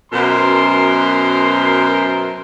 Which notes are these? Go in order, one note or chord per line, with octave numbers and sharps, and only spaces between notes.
F#2 B2 A#4 C5 C6